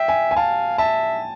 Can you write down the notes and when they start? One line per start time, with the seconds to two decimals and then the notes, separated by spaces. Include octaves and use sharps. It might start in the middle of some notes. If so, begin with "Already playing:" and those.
Already playing: E5 G5
0.08 G#5
0.31 G#5
0.36 F5 A5
0.78 E5 A5